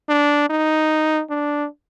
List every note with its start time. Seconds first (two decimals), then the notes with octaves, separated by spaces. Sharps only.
0.09 D4
0.50 D#4
1.30 D4